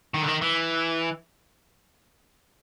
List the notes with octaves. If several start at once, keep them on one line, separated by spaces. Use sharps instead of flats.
D#3
D3
D#3
E3